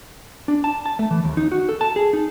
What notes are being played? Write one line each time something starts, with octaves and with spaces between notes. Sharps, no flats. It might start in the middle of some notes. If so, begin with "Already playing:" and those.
D4
A5
A5
A3
E3
D#2
D#4
F#4
A4
A5
G#4
D#4